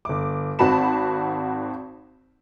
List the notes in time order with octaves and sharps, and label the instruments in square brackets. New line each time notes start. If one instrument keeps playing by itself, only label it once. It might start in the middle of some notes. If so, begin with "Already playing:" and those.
[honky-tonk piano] G1 D6
G#1 C4 F#4 A5 B5 E7